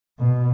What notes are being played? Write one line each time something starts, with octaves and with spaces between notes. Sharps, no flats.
B2